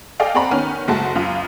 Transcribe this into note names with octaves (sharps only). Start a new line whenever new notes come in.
G#4 A4 D5 D#5 F5 G5
C4 G#4 D5 F#5 A#5 B5
D#3 B3 C#4 F6
F#1 G#3 A3 F#4 A5
C#2 F#2 F4 F5